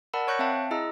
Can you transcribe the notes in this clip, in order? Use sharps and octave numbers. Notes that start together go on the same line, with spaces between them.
A#4 D5 F#5 A5 B5 E6
C#5 C#6 F#6 G6 A#6 C#7
C4 E5 F5 G5 A5
E4 G#4 D#5 A#5 E6